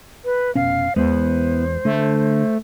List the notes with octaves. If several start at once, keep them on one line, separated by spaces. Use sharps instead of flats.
B4
F1 B2 C#4 F5
E2 G#3 B3 E4 C5
D3 A3